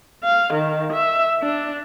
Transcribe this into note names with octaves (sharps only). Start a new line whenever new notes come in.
F5
D#3
E5
D4